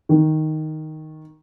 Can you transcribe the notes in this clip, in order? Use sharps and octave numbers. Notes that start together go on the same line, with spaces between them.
D#3